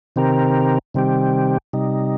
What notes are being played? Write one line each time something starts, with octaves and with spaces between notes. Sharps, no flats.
C3 D#3 C4 G4 A#4
C3 D#3 G3 C4 G4
C3 G3 D#4